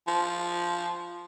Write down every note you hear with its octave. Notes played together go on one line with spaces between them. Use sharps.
F3